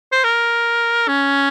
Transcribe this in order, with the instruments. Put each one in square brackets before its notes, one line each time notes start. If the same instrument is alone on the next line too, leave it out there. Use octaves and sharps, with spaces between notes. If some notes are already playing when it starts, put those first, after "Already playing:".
[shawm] C5
A#4
C#4